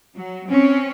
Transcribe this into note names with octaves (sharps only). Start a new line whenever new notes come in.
F#3
C4 C#4